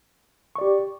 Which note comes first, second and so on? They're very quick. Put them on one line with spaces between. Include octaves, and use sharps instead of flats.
C#6 D5 G4